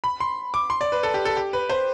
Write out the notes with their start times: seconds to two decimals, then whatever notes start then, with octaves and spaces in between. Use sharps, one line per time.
0.04 B5
0.20 C6
0.54 D6
0.70 C6
0.81 D5
0.92 B4
1.03 A4
1.14 G4
1.25 A4
1.37 G4
1.53 B4
1.70 C5